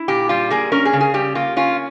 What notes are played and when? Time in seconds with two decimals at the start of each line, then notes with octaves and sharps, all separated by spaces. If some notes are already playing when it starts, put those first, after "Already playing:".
Already playing: E4
0.08 A#2 G4
0.29 G3 F4
0.50 A#3 G#4
0.72 C#4 A#4
0.85 G#4
0.93 C#3
1.01 G#4
1.14 G3 G4
1.35 A#3 F4
1.57 C#4 F4